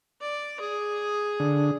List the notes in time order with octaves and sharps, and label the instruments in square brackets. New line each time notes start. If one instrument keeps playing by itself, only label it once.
[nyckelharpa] D5
G#4
[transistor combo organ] D3